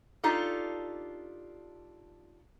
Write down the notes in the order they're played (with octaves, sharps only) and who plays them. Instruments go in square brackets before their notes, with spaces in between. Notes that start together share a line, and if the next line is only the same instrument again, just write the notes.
[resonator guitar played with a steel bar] D4 D#4 F4 G4 A4